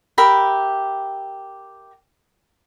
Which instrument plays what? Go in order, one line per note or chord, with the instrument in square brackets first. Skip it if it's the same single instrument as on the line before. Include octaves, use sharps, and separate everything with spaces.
[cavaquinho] G4 A#4 E5 B5